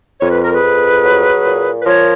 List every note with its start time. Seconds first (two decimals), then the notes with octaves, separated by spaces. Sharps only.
0.20 F2 C#5
0.32 B4
0.43 A#4
0.53 G#4 B4
0.62 F2
1.03 F#3
1.44 A#2
1.81 B4
1.85 F3 A#4 C#5